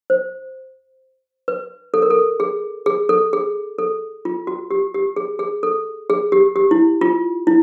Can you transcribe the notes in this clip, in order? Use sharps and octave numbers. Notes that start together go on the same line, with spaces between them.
C5
B4
A4
A#4
A4
G#4
G#4
A4
G#4
A4
F4
F#4
G4
G4
G#4
G#4
A4
G#4
G4
G4
E4
F4
E4